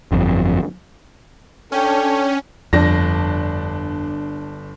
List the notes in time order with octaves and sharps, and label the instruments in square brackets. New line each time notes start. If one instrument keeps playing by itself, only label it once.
[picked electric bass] G1 F2
[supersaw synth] C#4 [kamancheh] D4 G5 [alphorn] A4
[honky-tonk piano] G1 D4 A#6 [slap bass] F2